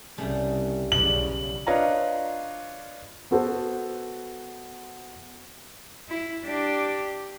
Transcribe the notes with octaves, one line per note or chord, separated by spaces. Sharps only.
C2 C#3 G3 A3
B1 E2 C#3 D4 B4 F#7
D4 F4 B4 C#5 D#5 A#5
B3 F#4 A4 C5
E4
D4 G4